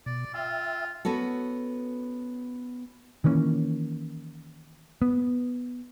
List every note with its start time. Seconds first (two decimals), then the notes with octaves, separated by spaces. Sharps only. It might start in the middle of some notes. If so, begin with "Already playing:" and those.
0.06 B2 D5
0.34 F4 E5 G5 E6
1.05 B3 C#4 F#4 A4
3.24 D#3 E3 A#3 C#4
5.02 B3